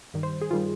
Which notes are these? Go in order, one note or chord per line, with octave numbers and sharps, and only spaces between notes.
G2 D#3 G3
C5
G#4
G2 D#3 G3 F4